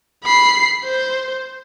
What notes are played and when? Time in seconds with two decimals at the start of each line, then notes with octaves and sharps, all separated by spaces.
0.24 B5 C7
0.85 C5